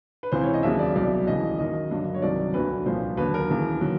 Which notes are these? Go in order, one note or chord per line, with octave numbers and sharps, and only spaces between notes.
B4
C#2 C3 E3 C5
C#5
D#5
D#2 C#3 F#3 E5
D5
C2 B2 F#3 D5
D#2 C#3 E3 D#5
F#2 D#3 F#3 D#5
G2 D3 F#3
C#5
C2 C3 D#3 F#3 D5
D2 D3 F#3 B4
C2 A#2 F3 C5
D#2 D3 F#3 B4
A#4
D#2 C#3 E3
D#3 F#3